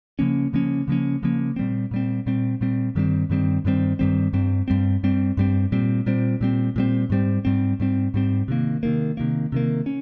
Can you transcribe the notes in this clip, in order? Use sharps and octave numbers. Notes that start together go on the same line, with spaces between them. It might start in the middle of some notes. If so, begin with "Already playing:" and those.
C#3 F3 A#3 C#4
C#3 F3 A#3 C#4
C#3 F3 A#3 C#4
C#3 F3 A#3 C#4
A#2 G3 C4
A#2 G3 C4
A#2 G3 C4
A#2 G3 C4
G2 D#3 G3 C4
G2 D#3 G3 C4
G2 D#3 G3 C4
G2 D#3 G3 C4
G2 G3 C4
G2 G3 C4
G2 G3 C4
G2 G3 C4
A#2 G3 C4
A#2 G3 C4
A#2 G3 C4
A#2 G3 C4
G#2 G3 C4
G#2 G3 C4
G#2 G3 C4
G#2 G3 C4
C3 D#3 A#3
C3 D#3 A#3
C3 D#3 A#3
C3 D#3 A#3
C#4